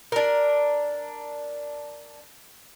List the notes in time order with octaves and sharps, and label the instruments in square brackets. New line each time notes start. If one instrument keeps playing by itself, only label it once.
[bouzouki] D4 A#4